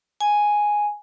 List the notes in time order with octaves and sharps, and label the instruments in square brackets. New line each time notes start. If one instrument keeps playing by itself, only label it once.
[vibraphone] G#5